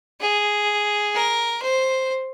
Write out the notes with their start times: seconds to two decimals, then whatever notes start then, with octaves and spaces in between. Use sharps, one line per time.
0.21 G#4
1.15 A#4
1.62 C5